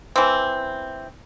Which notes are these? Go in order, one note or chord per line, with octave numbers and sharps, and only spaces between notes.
E3 C4